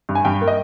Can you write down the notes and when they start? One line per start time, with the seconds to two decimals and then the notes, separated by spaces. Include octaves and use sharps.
0.09 G2
0.15 G#5
0.25 G2 G5
0.41 A#3
0.48 D#5